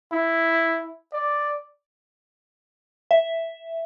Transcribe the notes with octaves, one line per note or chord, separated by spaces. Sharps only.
E4
D5
E5